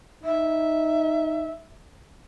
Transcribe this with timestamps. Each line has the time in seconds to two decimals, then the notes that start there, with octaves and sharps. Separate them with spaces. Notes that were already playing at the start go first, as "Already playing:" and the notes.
0.24 D#4 E5